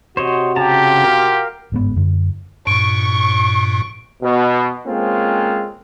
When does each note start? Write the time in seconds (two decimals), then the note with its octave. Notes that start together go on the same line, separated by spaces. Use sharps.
0.17 C3 F#4 C5 C#5 D#5
0.56 C#3 F4 G4 A5 A#5
1.04 A#4 F5
1.72 G1 G#2 B3
1.96 F#2 D3
2.67 G2 A#2 C#6 D7
4.23 B2
4.87 G#3 A#3 C4 C#4 F4 A4